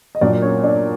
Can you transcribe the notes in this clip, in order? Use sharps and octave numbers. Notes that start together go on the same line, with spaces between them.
D#5
A#2 F#3 A#3 D4 D5
C#4 C#5
D4 D5